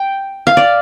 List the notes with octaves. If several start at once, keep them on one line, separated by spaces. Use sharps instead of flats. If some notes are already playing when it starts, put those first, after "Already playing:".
Already playing: G5
F5
D5